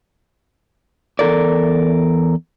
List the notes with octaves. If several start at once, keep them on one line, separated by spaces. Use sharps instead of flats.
E2 A4 A#4 D5